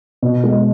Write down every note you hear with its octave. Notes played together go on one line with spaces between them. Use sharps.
B2
G#3